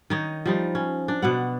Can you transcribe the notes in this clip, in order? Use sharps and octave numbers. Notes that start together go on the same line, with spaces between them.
D#3 D#4 C#5
F3 G3 D#4
C#4
D4
B2 B3 F#5